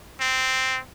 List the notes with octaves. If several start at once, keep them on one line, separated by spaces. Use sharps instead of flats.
C4